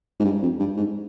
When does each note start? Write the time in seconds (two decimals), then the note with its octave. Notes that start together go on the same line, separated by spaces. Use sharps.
0.20 G#2
0.25 G2
0.42 F2
0.60 G2
0.77 G#2